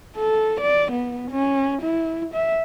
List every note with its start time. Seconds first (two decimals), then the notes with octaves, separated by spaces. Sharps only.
0.17 A4
0.61 D5
0.92 B3
1.31 C#4
1.82 E4
2.34 E5